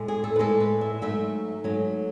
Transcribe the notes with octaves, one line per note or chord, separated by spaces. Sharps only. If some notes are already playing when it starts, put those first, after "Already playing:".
Already playing: A2 G#3
G#4
A4
B4
A2 G#3 A4
B4
E5
G#2 F#3 A3 E5
G#2 F#3 A3